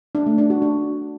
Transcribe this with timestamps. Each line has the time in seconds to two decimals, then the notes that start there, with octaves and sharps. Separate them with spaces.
0.15 D4
0.26 A3
0.38 D4
0.50 F#4
0.62 D4